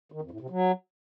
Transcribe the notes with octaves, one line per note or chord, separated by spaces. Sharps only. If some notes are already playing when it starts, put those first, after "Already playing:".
D#3
F2
A2
C3
F#3